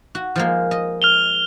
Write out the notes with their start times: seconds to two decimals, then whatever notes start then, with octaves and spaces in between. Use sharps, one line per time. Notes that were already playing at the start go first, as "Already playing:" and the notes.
0.15 F#4
0.36 F3 G#3 A#3
0.71 D#5
1.02 F6 F7 G7